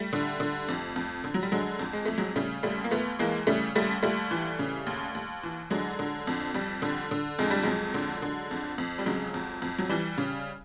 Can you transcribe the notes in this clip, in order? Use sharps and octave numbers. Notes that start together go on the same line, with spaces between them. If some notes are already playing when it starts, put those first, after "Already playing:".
Already playing: G3 A3
D3
D3
F2
F2
D3
F#3
G3
D3 F#3 G#3
F2
G#3
F2 A3
F#3 G#3
C#3 G3 A3
D#2 G3 A3
A#3
D#2 A3 B3
E3 G#3 A#3
C#3 G3 A3
D#2 G3 A3
D#2 G3 A3
E3
C#3
D#2
D#2
E3
D3 F#3 G#3
D3
F2
F2 G3
D3
D3
F2 G#3
G3
F2 F#3 G#3
D3
D3
F2
F2
G3
C#3 F#3 G#3
F2
F2
F#3
E3 G3
C#3